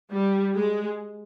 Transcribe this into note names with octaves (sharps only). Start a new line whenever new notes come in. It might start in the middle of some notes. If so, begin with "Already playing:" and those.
G3
G#3